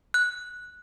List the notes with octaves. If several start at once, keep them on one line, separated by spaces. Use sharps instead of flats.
F#6